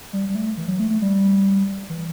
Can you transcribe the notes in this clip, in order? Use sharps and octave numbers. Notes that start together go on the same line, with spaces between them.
G3
G3
A3
E3
F#3
A3
A3
G3
E3